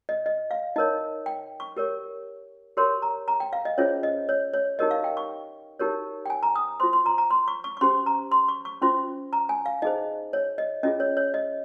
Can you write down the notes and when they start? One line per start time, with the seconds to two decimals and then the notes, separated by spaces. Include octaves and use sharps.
0.09 D#5
0.26 D#5
0.51 F5
0.76 D#4 A#4 C#5 D#5
1.26 G5
1.60 C#6
1.77 G4 A#4 C#5
2.77 G4 A#4 C#5 C6
3.02 A#5
3.28 A#5
3.40 G5
3.53 F5
3.65 D#5
3.78 C#4 F4 G#4 C5 C#5
4.03 D#5
4.29 C#5
4.54 C#5
4.79 D#4 G4 A#4 C#5 D#5
4.91 F5
5.04 G5
5.17 C#6
5.79 D#4 G4 A#4 C#5
6.26 G5
6.30 G#5
6.43 A#5
6.56 D#6
6.80 F4 C5 C6
6.93 C6
7.06 A#5
7.18 A#5
7.31 C6
7.48 C#6
7.64 C#6
7.77 C#6
7.81 C#4 G4 C5 C6
8.06 A#5
8.32 C6
8.48 C#6
8.65 C#6
8.82 C#4 F4 C5 C6
9.33 A#5
9.49 G#5
9.66 F5
9.82 D#4 G#4 C5 D#5
10.33 C#5
10.58 D#5
10.83 C#4 F4 G#4 D#5
11.00 C#5
11.17 C#5
11.34 D#5